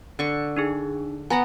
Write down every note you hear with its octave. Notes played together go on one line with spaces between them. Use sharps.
D3 C#6
D4 D#4 G#4
B3 F#5 G#5 A#5 A#6